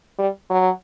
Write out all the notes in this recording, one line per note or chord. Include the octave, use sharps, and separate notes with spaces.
G3
F#3